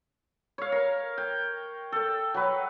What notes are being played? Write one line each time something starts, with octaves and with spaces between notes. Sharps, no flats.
C#5 F5
A#4
G5
A4 G5
F#3 B4